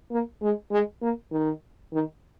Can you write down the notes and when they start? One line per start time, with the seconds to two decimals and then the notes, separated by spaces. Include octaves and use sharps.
0.11 A#3
0.42 G#3
0.71 G#3
1.02 A#3
1.32 D#3
1.93 D#3